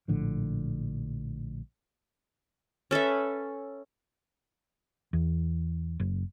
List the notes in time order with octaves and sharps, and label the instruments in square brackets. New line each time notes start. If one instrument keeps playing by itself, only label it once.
[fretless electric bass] A#1 A2 D3 F3
[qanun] C#4 A4 B4 E5
[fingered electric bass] E2
F#1